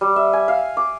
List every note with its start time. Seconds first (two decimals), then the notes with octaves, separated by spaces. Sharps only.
0.01 G3
0.16 E5
0.33 G#5
0.48 F5
0.77 D6